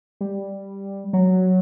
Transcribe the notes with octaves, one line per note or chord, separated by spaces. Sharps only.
G3
F#3